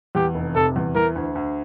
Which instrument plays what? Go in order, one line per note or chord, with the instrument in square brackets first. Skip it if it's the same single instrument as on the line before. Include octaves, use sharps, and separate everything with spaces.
[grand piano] E2 [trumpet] G4
[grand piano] F1
[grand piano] C3 [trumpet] A4
[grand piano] E2
[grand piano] E3 [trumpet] A#4
[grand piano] D2
D2